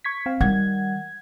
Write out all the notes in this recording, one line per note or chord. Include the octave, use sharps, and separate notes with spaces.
C#6 G#6 B6
C4 F5
D#3 G3 F#5 G#6